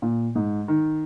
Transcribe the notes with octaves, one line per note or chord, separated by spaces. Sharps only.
A#2
G#2
D#3